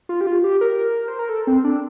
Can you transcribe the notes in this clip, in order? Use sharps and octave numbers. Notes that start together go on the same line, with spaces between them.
F4
G4
F4
G4
A#4
C5
A#4
A4
C4
D4